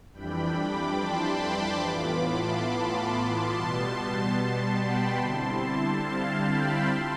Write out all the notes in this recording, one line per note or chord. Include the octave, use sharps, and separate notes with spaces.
F2 E3 G3 D4 G5 B5
B5 D6
A5 C6
G5 B5
A2 E3 B3 F4 B5 D6
A5 C6
B2 G3 B3 A5 C6
A5 C6
G5 B5
D3 G3 C4 E4 A5 C6
A5 C6
F5 A5
G5 B5
F4 A5 C6